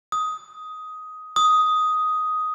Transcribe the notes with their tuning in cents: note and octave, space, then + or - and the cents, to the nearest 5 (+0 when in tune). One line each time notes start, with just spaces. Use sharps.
D#6 +10
D#6 +5